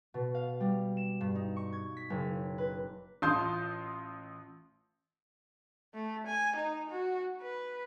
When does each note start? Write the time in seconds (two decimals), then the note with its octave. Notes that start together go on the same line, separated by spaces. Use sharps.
0.14 B2
0.35 F5
0.60 G3
0.97 E7
1.21 G2
1.35 D#4
1.56 C#6
1.73 G#6
1.97 B6
2.10 F#1
2.58 B4
3.22 A1 F4 A5 C6 D#6 G6
5.94 A3
6.27 G#5
6.57 D#4
6.91 F#4
7.42 B4